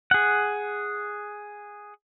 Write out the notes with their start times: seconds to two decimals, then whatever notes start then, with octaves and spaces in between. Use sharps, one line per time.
0.11 G#4 F#5